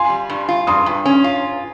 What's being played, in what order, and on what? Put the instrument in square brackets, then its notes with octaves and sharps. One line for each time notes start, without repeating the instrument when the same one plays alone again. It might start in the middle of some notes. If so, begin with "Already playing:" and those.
Already playing: [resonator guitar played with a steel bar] F4 [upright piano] G#5 C6
[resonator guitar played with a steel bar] G3
G2
F4
[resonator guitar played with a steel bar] G2 [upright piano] C6 D#6
[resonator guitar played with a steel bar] G2
C#4
F4